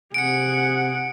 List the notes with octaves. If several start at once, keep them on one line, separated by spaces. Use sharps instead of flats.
C3 G#4 F#5 C#7 D7